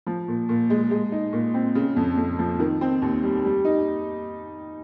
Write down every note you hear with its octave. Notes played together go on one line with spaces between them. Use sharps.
F3
A#2
A#2
G#3
G#3
D#4
A#2
C4
C#3
F2
F2
F3
D#3
C4
D#2
G3
G3
D#4